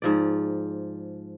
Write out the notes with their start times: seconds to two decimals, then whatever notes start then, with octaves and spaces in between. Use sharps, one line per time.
0.02 G#2 F3 D5